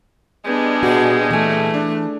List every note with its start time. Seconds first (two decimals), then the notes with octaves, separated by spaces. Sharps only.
0.45 G3 G#3 B3 D4
0.83 A#2 F#4 G#4 A4
1.30 E3 A3 G#5
1.74 D4